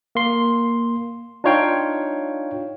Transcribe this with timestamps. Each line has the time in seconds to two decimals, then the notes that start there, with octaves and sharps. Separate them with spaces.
0.15 A#3 C6
1.44 D4 D#4 F4 C#5 F5 G5